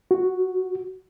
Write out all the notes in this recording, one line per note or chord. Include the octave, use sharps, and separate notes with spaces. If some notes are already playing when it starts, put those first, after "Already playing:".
F#4